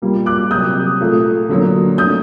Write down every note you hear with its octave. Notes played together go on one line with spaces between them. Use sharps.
A#2 G3 A#3
D6 F#6
C3 F#3 A#3 D#6 G6
A#2 A3
D3 F#3 A#3
D3 A3 D#6 G6